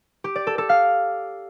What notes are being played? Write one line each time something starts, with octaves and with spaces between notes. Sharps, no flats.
G4
D5
A4
A4
F5